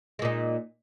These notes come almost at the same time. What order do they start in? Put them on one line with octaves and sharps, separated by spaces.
G#3 A#2 D#4